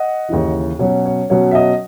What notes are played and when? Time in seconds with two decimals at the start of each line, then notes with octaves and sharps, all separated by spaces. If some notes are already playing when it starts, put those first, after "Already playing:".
Already playing: D#5 F#5
0.29 D#2 C#3 E3
0.79 B2 F#3 C#4 C#5
1.06 C#5
1.30 B2 F#3 C#4 C#5
1.51 E5
1.55 D#5